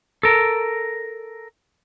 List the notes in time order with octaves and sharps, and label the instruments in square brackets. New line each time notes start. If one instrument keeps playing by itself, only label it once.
[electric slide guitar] A4 A#4